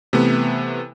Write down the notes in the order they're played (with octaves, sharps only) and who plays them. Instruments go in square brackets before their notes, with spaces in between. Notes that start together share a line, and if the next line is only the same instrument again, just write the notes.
[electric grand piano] C3 E3 A3 B3